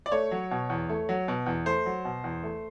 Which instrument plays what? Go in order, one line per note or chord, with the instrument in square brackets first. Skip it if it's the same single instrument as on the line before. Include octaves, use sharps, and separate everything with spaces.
[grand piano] D5
A3 C#5
F#3
B2
E2
A3
F#3
B2
E2
A3 C5
F#3
B2
E2
A3